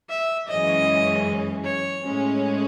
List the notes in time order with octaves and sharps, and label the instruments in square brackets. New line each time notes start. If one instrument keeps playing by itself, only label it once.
[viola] E5
[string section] F#2 E3 G#3 C#4 [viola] D#5
[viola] C#5
[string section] A2 G#3 C#4